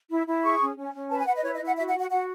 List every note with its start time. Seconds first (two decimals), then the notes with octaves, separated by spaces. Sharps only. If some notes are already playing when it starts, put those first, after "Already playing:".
0.10 E4
0.26 E4
0.44 G#4 C#6
0.61 C#4
0.77 C#4
0.94 C#4
1.10 B4 A5
1.19 G#5
1.26 B4 F#5
1.36 D#5
1.43 E4 C#5
1.54 D#5
1.60 E4
1.66 F#5
1.77 F#4 E5
1.88 F#5
1.93 F#4
1.99 F#5
2.10 F#4 F#5